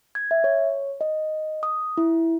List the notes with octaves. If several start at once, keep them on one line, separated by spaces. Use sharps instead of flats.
G#6
E5
C#5
D#5
D#6
E4